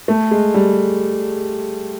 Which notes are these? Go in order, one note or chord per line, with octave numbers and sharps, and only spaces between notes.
A3
G#3
G3